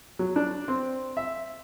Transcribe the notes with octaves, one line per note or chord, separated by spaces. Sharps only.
F#3
D4
C4
E5